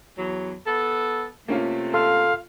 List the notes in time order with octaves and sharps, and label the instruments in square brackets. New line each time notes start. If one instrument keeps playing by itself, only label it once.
[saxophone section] E2 F#3
B3 A4
[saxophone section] C3 A3 [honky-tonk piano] A#3 C#4 F4
[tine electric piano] A4 C6 [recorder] F5